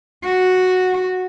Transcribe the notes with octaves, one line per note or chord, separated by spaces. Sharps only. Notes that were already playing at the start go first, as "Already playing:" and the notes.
F#4